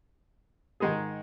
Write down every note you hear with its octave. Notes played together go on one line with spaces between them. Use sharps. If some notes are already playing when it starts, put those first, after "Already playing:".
G#2 D#3 G#3 D#4 G#4